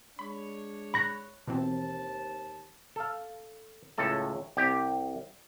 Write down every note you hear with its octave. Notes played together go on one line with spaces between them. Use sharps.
G#3 D4 C#5 B5
B5 C#6 F#6 A#6
D#2 B2 E3 C4 C5 A5
A4 F5
C#2 A2 A4 A5
C2 G4 G5